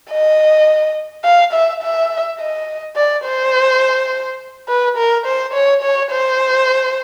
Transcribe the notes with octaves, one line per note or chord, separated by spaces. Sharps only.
D#5
F5
E5
E5
D#5
D5
C5
B4
A#4
C5
C#5
C#5
C5